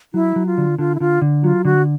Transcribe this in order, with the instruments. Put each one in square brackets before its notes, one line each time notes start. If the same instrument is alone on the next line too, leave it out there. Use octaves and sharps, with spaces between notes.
[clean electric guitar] F#3 [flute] E4
[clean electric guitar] F#3
[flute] F4
[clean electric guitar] D3
[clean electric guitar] D3 [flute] F4
[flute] E4
[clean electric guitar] D3 [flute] F4
[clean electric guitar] D3
[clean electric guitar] F#3 [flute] F4
[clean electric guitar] D3 [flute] F#4